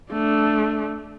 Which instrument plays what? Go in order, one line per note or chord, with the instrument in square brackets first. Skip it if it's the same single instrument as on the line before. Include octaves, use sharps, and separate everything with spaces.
[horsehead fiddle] A3 D4